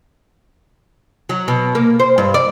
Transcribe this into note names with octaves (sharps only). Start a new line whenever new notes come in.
F#3
B2
A#3
C5
G2
D5